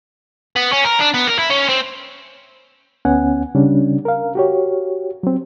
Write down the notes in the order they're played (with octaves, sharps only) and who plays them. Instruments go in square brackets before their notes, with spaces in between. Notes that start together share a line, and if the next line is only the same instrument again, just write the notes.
[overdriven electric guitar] B3
C#4
A#4
D4
B3
A#4
E4
C#4
C4
[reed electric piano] D2 B3 C#4 F#5 G#5
C#3 G3 C#4 D4
A#4 F5
F#4 G4 C#5
F#3 C4